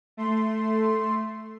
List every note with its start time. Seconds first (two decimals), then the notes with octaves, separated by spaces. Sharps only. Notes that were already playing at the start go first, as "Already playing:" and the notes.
0.17 A3 C6